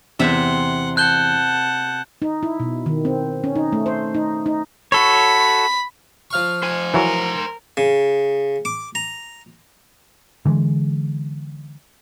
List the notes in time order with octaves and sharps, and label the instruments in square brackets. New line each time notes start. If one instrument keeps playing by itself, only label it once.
[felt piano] E2 [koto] C3 C4 E5 [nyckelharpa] F#5 C6
[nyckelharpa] F#5 A5 [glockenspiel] F#6 G6 G7
[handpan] D#4
E4
B2
D#3
C4
C#4
D#4
A3
C5
D#4
D#4
[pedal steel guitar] F#4 A4 C#5 [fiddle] B5
[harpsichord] F3 F5 C#6
[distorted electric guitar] C5 G#5
[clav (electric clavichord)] E3 F#3 [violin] A#4
[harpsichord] C#3
D6
A#5
[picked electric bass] D3 E3 G3 G#3